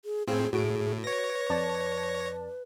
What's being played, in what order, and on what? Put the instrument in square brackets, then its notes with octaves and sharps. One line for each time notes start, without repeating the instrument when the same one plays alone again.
[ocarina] G#4
[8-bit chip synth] A2 C4 [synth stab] F4 G#5 [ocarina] G#4
[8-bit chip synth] A2 [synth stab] F#4 D7 [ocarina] G#4
[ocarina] B4 [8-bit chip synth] C#5 A#6
[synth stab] F2 D5 A5